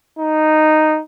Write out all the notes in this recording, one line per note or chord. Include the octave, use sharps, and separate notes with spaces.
D#4